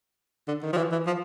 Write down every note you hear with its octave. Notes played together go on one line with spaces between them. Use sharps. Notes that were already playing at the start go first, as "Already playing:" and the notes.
D3
D#3
F3
E3
E3
F3